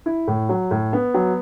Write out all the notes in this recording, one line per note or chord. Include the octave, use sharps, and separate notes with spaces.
E4
A2
F#3
A2
B3
F#3